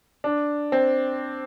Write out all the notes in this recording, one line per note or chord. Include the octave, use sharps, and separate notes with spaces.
D4
C4